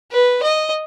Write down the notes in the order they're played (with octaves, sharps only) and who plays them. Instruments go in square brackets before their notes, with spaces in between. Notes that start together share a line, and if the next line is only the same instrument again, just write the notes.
[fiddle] B4
D#5